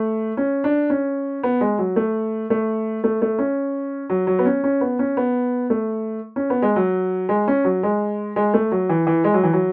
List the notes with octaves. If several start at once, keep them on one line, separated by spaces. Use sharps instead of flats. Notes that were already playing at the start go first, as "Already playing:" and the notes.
Already playing: A3
C#4
D4
C#4
B3
G#3
F#3
A3
A3
A3
A3
C#4
F#3
F#3
B3
C#4
C#4
B3
C#4
B3
A3
C#4
B3
G#3
F#3
G#3
C#4
F#3
G#3
G#3
A3
F#3
E3
E3
G#3
F#3
E3
F#3